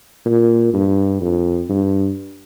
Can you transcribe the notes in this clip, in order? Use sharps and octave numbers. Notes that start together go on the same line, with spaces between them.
A#2
G2
F2
G2